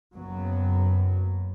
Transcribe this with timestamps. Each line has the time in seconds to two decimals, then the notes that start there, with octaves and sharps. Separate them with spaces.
0.15 F#1 F#2 F#3 B3